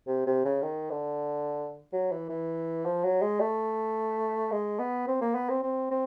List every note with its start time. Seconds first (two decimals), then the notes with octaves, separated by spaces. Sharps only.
0.07 C3
0.26 C3
0.45 C#3
0.62 D#3
0.91 D3
1.93 F#3
2.11 E3
2.29 E3
2.85 F3
3.04 F#3
3.22 G#3
3.40 A3
4.52 G#3
4.79 B3
5.08 C4
5.21 A#3
5.35 B3
5.49 C4
5.63 C4
5.91 C4